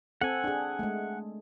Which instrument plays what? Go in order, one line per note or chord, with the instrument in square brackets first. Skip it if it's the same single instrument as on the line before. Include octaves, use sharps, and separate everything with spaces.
[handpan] C4 A4 [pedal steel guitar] F#5 G#5
[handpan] D4 G#4
G#3 A3